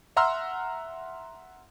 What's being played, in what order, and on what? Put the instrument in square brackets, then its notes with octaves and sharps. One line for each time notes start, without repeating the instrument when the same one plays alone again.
[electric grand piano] E5 F#5 A#5 C6 E6 F6